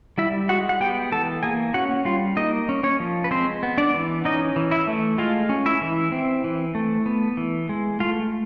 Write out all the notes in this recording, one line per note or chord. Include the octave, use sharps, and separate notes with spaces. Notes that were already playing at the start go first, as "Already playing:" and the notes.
G3 E4 E5
G#3 F#4 F#5
F#5
B3 G4 G5
E3 A4 A5
A#3 G#4 G#5
C#4 F#4 F#5
G3 F4 F5
A#3 D#4 D#5
C#4
C#4 C#5
F3
B4
G#3 C4 C5
B3
D4 D5
E3
C#4 D#4 D#5
E3
E4 E5
A3
G#3 F4 F5
C#4
E4 E5
E3
C4
E3
A3
B3
E3
G#3
A3 F4 F5